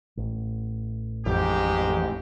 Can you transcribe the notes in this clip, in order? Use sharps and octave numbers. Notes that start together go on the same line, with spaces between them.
A1
A1 F2 G#2 G4